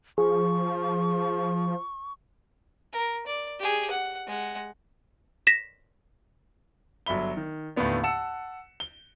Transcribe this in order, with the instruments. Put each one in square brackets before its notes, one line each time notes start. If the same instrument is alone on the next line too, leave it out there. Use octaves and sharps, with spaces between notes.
[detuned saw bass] F3 [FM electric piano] G#4 [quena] C#6
[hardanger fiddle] A#4
D5
G4 G#4
F#5
G#3 F#5
[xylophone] A#6 B6 E7
[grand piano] G1 F#3 E5 B5 G7
D#3
D#2 A2 D3 B3 D4
F#5 A5 E6 C#7 E7
G7